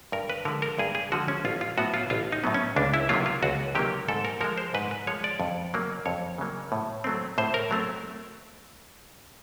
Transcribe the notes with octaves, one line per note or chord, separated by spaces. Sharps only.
G2 A#4
B4
D3 F3 G#3 A#4
A#4
G2 G#4
G#4
D3 F3 G#3 F#4
C#4
A1 F4
F4
A2 F#3 B3 F#4
F4
A1 F4
D#4
A2 F#3 B3
C#4
C#2 D4
E4
C3 D#3 F#3 A#3 F4
F4
C#2 F#4
C3 D#3 F#3 A#3 G4
G#2 A4
A#4
F3 G#3 A#4
C5
G#2 B4
B4
F3 G#3 C#5
D5
F2
C#3 F#3 A#3
F2 C#5
C#3 F#3 A#3
A2
F#3 A3 C4
A2 C5
A#4
F#3 A3 C4